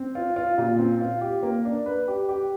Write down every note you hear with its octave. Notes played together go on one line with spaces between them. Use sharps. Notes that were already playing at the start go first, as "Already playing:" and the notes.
Already playing: C4
F4
F4
A#2
C4
F4
G4
A#3
D4
B4
G4
G4